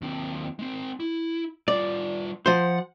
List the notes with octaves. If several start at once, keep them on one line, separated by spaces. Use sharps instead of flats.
D#2 C4
G#3 C4
E4
G3 F4 D5
F3 C5 F#5